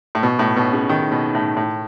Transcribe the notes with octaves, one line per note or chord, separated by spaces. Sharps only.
A2
B2
A2
B2
C#3
D#3
B2
A2
A2